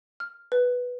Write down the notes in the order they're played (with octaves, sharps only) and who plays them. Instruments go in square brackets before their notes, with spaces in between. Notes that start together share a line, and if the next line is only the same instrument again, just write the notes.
[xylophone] F6
B4